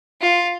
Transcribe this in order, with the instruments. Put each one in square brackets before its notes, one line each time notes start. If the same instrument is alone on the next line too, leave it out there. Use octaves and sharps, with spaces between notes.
[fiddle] F4